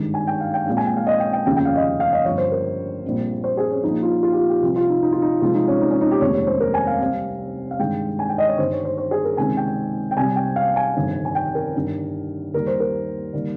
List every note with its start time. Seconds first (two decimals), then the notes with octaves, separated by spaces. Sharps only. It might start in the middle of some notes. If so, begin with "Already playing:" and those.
Already playing: G#1 G2 D#3 G#3
0.14 G#5
0.27 G5
0.41 F5
0.54 G5
0.67 A#1 A#2 G#3 C4 F5
0.77 G#5
0.86 G5
0.97 F5
1.07 D#5
1.20 G5
1.33 G5
1.46 F1 D#2 C#3 F3 G5
1.56 G5
1.65 F5
1.76 D#5
2.00 F5
2.13 D#5
2.25 G1 G2 F3 C#5
2.38 C5
2.52 A#4
3.04 A#1 A#2 G3 C4
3.44 C5
3.57 G#4
3.70 C#4
3.83 A#1 A#2 F3 D#4
4.03 F4
4.23 F4
4.32 G4
4.37 F4
4.50 G4
4.62 C2 C3 F3 C4
4.76 F4
4.89 D#4
5.03 D#4
5.12 F4
5.22 D#4
5.42 C2 C3 F3 G#3 C4 F4
5.54 D#4
5.68 C#4
5.81 D#4
5.91 C#4
6.01 D#4
6.11 G4
6.21 F1 D#2 D#3 G#3 C4 C#5
6.34 C#5
6.47 C5
6.60 A#4
6.74 G#5
6.87 F5
7.00 C2 C3 G3 C4
7.71 F5
7.79 G2 D#3 G#3 C4 G5
8.19 G#5
8.29 G5
8.38 D#5
8.48 C#5
8.58 G1 G2 D#3 C5
8.72 C#5
8.85 C5
8.98 C5
9.11 G#4
9.25 A#4
9.37 C#2 C3 D#3 G#3 C4 G#5
9.57 G5
10.11 G5
10.17 C2 C3 G3 G#5
10.36 G5
10.56 F5
10.76 G#5
10.96 G1 F2 C3 D#3
11.25 G#5
11.35 G5
11.55 A#4
11.75 G1 G2 D#3
12.54 D#2 D#3 G3 A#4
12.67 C5
12.80 A#4
13.33 D#3 G3 A#3